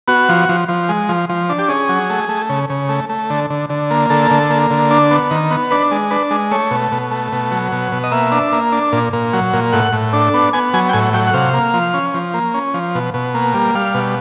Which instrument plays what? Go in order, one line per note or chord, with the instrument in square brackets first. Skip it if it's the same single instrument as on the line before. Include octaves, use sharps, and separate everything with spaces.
[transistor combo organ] B3 F#4
F3
F3
F3
G#3
F3
F3
D4
G4
C#4 G#4
F#3
A3
A3
C#3
C#3
A3
A3
D3
D3
D3
A#3
D3 A4
D3
A#3
D3
D4
B3
D#3
B3
D4 B4
G#3
D4 B4
G#3
A3 C#5
B2
B2
A3
B2
F#3
B2
B2
D#5
A#3 E5
D4
A#3
D4
A#2
A#2
F#3
A#2
A2 F#5
A2
D4
B3
B3 G#5
F#3 G#5
G5
A2 G#5
F#3 G5
F#5
C3 F5
A#3
F3
C#4
F3
A#3
C#4
F3
B2
B2
A#3
G3
G3 F5
B2